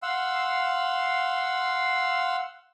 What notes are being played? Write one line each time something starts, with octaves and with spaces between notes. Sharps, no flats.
F5 F#5 C6 E6